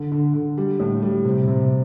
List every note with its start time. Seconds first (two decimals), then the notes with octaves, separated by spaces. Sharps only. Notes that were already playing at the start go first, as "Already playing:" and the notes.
Already playing: D3
0.12 D3
0.34 D3
0.58 G3
0.80 A2
1.02 G3
1.25 C3
1.47 C3